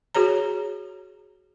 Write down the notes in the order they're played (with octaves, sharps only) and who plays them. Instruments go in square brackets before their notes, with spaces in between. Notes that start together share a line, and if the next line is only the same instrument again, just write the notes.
[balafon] F#4 G#4 C#5 A#5